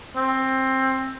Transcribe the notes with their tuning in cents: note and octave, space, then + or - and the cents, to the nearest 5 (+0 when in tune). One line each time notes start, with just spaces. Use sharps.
C4 +15